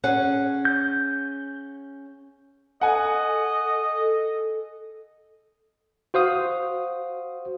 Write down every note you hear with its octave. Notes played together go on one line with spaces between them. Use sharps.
C#4 G#4 F#5
G6
A4 D#5 F#5 G#5
F#4 C5 F5 D#6